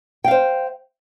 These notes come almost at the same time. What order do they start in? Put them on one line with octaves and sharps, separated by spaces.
G5 F5 C5